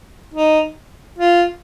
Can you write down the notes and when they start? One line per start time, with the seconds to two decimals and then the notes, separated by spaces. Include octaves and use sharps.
0.34 D#4
1.18 F4